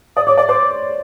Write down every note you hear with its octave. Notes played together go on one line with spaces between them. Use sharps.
D5 D#6
C#5 D6
D5 D6
C5 D6